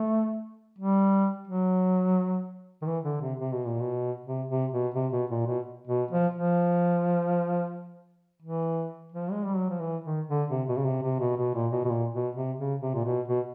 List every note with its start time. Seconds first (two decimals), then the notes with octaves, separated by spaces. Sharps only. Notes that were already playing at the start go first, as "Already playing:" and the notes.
Already playing: A3
0.79 G3
1.48 F#3
2.82 D#3
2.87 E3
3.04 D3
3.21 C3
3.39 C3
3.53 B2
3.66 A#2
3.80 B2
4.26 C3
4.49 C3
4.72 B2
4.95 C3
5.12 B2
5.30 A#2
5.47 B2
5.88 B2
6.11 F3
6.34 F3
8.42 E3
9.12 F3
9.32 G#3
9.44 G3
9.56 F#3
9.69 F3
9.81 E3
10.04 D#3
10.27 D3
10.51 C3
10.68 B2
10.77 C#3
10.85 C3
11.03 C3
11.20 B2
11.37 B2
11.54 A#2
11.72 B2
11.85 B2
11.89 A#2
12.13 B2
12.35 C3
12.59 C#3
12.82 C3
12.94 A#2
13.05 B2
13.28 B2